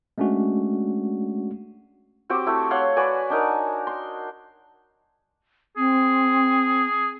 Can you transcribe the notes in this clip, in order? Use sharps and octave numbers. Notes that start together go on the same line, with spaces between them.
G#3 A3 C#4 D4 F#4
C4 F#4 G4 D6
A3 E4
C#5 F5 F#5 C6
F#4 B4 D5 G#5
D4 D#4 A#4
C6
C4 G#4